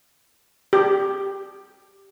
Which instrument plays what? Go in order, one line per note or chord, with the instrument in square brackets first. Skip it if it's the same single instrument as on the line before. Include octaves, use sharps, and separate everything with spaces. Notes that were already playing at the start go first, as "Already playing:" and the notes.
[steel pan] G4